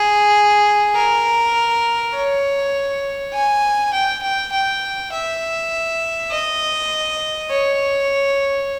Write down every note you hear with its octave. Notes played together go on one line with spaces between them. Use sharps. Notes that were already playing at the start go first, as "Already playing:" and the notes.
Already playing: G#4
A#4
C#5
G#5
G5
G5
G5
E5
D#5
C#5